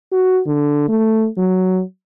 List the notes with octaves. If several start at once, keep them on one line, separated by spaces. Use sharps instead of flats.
F#4
D3
A3
F#3